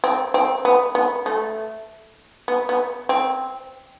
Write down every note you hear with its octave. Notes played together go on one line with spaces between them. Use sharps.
C4
C4
B3
B3
A3
B3
B3
C4